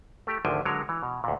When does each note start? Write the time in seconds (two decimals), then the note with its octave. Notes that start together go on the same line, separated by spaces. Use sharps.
0.27 A3 G4
0.45 G#1 D2 D3 F3 G5 G#5
0.65 D3 F#3 G#3 A#4 C#5
0.89 E3
1.03 B2
1.24 D2 A#2